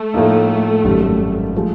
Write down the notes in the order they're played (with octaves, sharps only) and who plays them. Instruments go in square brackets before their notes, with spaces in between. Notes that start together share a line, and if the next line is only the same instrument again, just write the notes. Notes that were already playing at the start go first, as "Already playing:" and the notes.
Already playing: [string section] A3
[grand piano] A2 F3 A#3 D#4
G#1 F#2 D#3 G3
F3 G#3